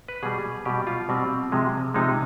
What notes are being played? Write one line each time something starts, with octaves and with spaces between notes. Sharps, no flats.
B4
B2 G3 G#4
B2 G3 G4
F4
B2 G3 C4
C3 F3 G#3
C3 F3 G#3 D#4